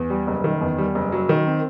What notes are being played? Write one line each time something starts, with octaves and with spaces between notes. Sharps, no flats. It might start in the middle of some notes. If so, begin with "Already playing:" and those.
Already playing: E2
G3
F#1
D#3
E2
G3
F#1
F#3
D#3
C4